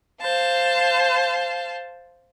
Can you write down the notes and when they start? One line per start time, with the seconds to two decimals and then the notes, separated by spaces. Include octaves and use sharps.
0.21 C5 F5 A5